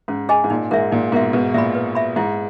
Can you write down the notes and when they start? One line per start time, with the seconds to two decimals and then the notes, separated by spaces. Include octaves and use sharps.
0.08 G#2 C#4
0.29 G#4 D#5 G#5
0.44 G#2
0.50 A#2 D#4
0.71 G#2 A#4 E5
0.91 A#2 D#4
1.12 G#2 B2 A#4 E5
1.33 G#2 B2 B4
1.54 A#2 E5 B5
1.75 B4
1.95 E5 B5
2.16 G#2 E4